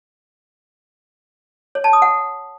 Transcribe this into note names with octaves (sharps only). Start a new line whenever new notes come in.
C#5
A5
D#6
F#5